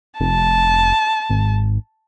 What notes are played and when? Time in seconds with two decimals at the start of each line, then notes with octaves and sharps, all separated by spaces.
0.20 F1 A5
1.30 G#1